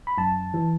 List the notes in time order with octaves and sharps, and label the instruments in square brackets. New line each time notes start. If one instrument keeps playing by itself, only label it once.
[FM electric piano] B5
F#2 A5
E3